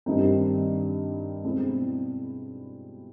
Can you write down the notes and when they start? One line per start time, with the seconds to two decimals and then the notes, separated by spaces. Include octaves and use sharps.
0.06 G2 D#3 G3 C4 D#4
1.44 B2 G#3 C4 E4